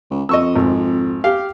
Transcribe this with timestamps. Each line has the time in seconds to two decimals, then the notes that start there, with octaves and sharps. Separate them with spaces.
0.11 C#2
0.29 F2 D#5 C#6 E6
0.56 G#1
1.24 G4 F5